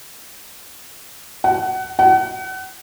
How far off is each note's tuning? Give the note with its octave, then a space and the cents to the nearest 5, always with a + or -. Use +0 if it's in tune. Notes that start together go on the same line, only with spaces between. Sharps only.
F#5 +25
F#5 +35